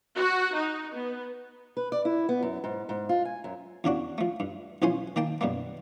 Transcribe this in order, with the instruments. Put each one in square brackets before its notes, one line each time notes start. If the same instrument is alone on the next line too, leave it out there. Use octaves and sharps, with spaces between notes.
[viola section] F#4
D#4
B3
[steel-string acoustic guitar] B4
D5
E4
B3
F#2
G#2
G#2
F4
G#5
F#2
[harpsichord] E2 C#3 D4 F#4
F3 A3
G2
B1 E3 F3 C#4 C5 G#5
D#3 A#3 G5 A5
F#2 B2 G3 A#3